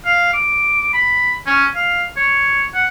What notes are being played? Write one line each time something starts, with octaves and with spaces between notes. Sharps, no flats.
F5
D6
B5
C#4
F5
C#5
F#5